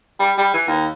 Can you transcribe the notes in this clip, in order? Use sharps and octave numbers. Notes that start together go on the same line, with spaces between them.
G3
G3
E3
D#2